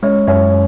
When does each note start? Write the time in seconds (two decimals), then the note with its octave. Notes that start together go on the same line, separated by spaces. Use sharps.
0.02 G#3 C#4 C#5
0.27 F#2 C#4 C#5